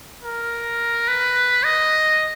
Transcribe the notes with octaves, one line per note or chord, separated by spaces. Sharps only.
A#4
B4
D#5